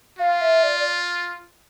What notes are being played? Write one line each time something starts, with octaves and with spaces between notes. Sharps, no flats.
F4 F5
E5
D5
D5